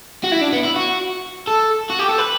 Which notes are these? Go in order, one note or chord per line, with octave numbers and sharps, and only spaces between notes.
F#4
E4
D4
B3
E4
F#4
A4
F#4
G4
A4
B4